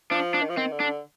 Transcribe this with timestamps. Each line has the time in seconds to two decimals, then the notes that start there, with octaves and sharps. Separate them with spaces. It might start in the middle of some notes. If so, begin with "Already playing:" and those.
0.11 F3 D4
0.34 D4
0.41 D#3
0.49 F3
0.56 D#3 C4
0.72 D3
0.80 D4